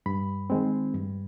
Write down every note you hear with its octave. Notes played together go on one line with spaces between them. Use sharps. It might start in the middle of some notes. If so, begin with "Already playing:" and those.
G2 B5
D#3 G#3 C4
G2